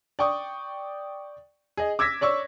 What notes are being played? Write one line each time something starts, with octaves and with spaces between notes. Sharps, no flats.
D5 G5 C#6 D#6
G#4 D#5
D6 E6 G#6 A#6 B6
C#5 D5 C#6 E6